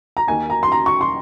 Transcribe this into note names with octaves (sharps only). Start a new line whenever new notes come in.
A#5
D#2 D#3 A#3 G#5
A#5
C6
A#5
C#6
C6